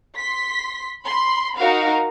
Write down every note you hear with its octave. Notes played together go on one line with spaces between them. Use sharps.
C6 B6
B5 C6
D#4 F#4 A#4 F5